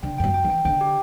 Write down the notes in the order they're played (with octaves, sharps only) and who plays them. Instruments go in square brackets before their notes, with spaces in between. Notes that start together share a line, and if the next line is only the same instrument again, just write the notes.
[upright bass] D3 [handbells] G5
[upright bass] G2 [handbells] G5
[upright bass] F#2
[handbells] G5
[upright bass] E3
[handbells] G5
[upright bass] D3 [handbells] G5
[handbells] G4